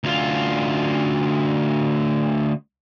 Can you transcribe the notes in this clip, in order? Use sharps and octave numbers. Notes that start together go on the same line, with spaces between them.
D2 F4